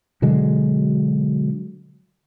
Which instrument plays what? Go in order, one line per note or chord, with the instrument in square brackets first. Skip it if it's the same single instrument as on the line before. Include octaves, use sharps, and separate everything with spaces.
[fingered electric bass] B2 D3 F#3 G#3